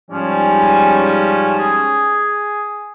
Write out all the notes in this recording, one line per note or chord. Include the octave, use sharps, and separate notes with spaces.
G#2 F3 G3 C#4
G#4